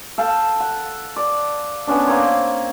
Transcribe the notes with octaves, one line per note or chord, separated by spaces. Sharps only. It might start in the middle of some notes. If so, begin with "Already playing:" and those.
A4 F5 G5 A5
F#5
D5
B3 C#4 D4
A#3 C4 A#4 C#5